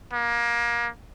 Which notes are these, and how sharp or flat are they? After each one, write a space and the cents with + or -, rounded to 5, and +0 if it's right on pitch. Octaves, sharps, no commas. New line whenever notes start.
A#3 +25